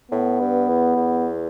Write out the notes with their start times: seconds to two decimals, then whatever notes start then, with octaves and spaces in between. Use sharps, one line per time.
0.11 A2 B3
0.40 G2
0.68 E2
0.96 E2